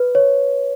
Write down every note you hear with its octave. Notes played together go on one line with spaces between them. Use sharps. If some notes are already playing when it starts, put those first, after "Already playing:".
Already playing: B4
C#5